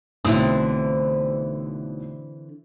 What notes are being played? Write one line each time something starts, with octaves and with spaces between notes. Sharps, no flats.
B1 A2 D3 E3 C4 D#6